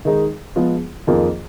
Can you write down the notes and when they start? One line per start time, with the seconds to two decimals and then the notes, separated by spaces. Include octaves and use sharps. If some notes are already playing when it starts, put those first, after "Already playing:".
0.05 D#3 G#3 D#4 G#4
0.56 F3 G#3 B3 F4 G#4
1.07 F2 D#3 A#3 F4 G#4